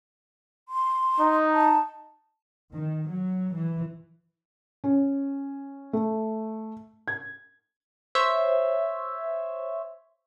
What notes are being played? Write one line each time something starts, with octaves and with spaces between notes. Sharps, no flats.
C6
D#4
A5
D#3
F#3
E3
C#4
A3
G#6
C5 C#5 E5